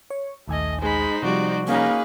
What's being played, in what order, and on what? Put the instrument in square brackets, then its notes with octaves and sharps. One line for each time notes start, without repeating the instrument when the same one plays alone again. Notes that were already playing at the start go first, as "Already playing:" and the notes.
[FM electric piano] C#5
[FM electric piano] A#1 D#2 G#5 [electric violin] A3 D#5
[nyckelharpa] G#3 B5 [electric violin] D#4 C5
[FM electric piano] C3 F3 G3 [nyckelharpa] F#4 D5
[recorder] A#3 [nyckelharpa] C#4 D#4 [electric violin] G#4 B4